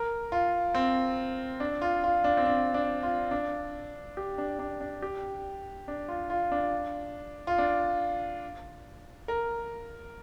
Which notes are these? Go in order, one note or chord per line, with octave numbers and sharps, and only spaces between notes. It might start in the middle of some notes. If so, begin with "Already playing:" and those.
Already playing: A#4
F4
C4
D4
F4
F4
D4
C4
D4
D4
F4
D4
G4
D4
D4
D4
G4
D4
F4
F4
D4
F4
D4
A#4